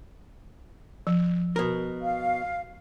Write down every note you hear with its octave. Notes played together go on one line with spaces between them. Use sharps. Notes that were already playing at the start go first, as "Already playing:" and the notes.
F3
B2 A#4
F5